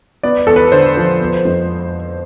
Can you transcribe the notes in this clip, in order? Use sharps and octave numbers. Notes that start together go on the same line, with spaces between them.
B3 D5
E2 A4
B4
D3 C5
F3
B3
F2